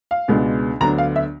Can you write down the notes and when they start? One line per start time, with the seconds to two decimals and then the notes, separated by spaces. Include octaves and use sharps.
0.11 F5
0.28 C#2 B2 G#3 B3 D4
0.80 D2 D3 F#3 B3 D4 A#5
0.98 F5
1.16 E5